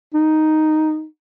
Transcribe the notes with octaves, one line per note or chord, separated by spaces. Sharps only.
D#4